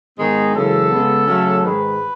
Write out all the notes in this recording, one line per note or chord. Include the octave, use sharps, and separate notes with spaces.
G#2 D#3 G#3 B3 D#4 G#4
F#2 C#3 E3 G#3 A4
C#3 G#3 B3
C#3 F#3 A3 C#4
G#2 D#3 G#3 B4